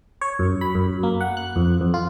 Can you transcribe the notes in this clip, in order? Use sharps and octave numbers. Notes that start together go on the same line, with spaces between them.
C#5
F#2
B5
F#2
A#3
F#5
F#6
F2
F2
F4